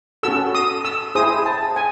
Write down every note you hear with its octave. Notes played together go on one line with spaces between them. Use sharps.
C#4 F#4 A4 E6
D#6
E6
E4 G#4 C5 D#6
A5
G#5